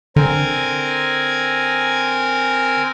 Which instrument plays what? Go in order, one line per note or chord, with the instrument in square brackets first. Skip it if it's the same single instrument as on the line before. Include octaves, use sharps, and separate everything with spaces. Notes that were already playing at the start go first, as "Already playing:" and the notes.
[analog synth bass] D3 [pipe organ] C4 A#4 G#5